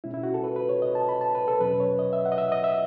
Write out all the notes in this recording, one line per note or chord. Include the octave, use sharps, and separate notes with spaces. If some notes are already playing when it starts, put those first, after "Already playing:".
B2 G#3 C#4 E4
E4
F#4
A4
B4
B4
C#5
D#5
A5
B5
A5
B4
A4
E2 B2 F#3 C#4 B4
C#5
D#5
E5
F#5
D#5
E5
D#5
E5